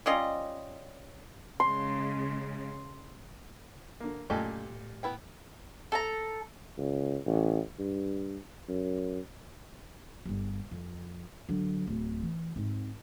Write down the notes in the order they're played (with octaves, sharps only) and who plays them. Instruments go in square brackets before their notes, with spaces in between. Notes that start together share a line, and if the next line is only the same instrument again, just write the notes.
[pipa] G3 C#4 F4 D#5
[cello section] C#3 G#3 [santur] C6
[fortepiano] D3 A#3
[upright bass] F#2 A3 [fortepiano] A#2 A4 G#5 [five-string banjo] G4 D#5
[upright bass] A2
[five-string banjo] B3 E4 G5
[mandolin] A4 A5 A#5
[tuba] C#2
A1
G2
F#2
[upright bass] G1 G3
F2
D3 F#3
D1
E3
G#2 C4